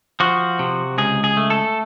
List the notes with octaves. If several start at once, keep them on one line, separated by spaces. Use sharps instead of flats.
F3 F#4
C3
C#2 G#4
G#4
A3
A4